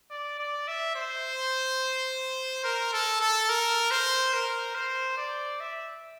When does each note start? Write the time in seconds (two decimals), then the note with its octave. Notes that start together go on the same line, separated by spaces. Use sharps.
0.10 D5
0.39 D5
0.68 E5
0.95 C5
2.64 A#4
2.93 A4
3.21 A4
3.49 A#4
3.91 C5
4.34 A#4
4.75 C5
5.18 D5
5.60 E5